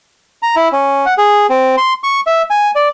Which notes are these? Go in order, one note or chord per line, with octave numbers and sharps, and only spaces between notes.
A#5
E4
C#4
F#5
G#4
C4
C6
C#6
E5
G#5
D5